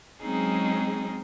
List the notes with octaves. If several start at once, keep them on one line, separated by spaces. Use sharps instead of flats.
F#3 G#3 C4 C#4 D#4 G#4